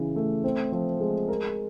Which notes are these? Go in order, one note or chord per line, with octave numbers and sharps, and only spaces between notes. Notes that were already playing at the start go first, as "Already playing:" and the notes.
Already playing: C#3 E3
A3
C4
F3
G#3
A#4